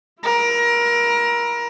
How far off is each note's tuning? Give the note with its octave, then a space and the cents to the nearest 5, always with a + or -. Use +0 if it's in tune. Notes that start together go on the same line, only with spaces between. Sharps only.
E4 +35 A#4 +25